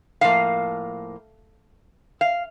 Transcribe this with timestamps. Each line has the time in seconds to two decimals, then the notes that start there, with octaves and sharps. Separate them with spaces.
0.21 A2 F3 A#3 F5
2.21 F5